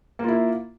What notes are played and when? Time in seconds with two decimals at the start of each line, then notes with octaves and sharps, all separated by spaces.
0.19 A#3
0.24 F4
0.28 E4